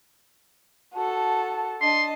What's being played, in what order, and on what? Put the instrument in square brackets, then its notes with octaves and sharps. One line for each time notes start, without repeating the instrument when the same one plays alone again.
[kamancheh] F#4 A4 [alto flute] A5
[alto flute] D4 [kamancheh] D#5 A5 [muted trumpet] C6